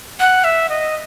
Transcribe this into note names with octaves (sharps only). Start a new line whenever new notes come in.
F#5
E5
D#5